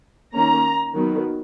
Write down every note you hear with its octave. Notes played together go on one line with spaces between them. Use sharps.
D#3 A#3 C#4 A#5
D#3 F#3 B3